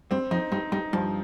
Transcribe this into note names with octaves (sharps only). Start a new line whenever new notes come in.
G2 C4
F2 D#4
G2 D#4
G2 D#4
G2 F3